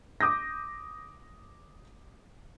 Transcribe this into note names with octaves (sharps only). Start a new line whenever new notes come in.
D6 D#6 G6 A#6